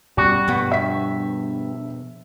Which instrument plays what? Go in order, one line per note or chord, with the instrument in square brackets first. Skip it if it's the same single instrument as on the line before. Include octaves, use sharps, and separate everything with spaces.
[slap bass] G2 B2 C#4 [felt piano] G3 [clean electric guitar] F#4
[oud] G2 B3 [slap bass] B2 F3
[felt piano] E5 B6